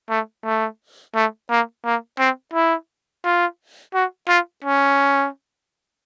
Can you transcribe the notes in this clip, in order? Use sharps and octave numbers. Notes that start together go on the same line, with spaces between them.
A3
A3
A3
A#3
A#3
C4
E4
F4
F#4
F4
C#4